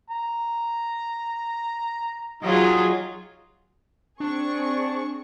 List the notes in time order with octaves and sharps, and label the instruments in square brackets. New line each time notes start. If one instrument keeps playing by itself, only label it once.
[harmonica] A#5
[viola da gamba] F#3 F4 G#4 [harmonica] G3 D#4 D#5
[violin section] C4 G#4 C#6 [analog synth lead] D4